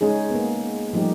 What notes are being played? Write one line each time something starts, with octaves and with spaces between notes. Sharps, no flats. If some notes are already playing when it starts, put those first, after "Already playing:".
G#3 C#4 D#4 G#4
A#3 B3
F3 G3 A3 D#4 G4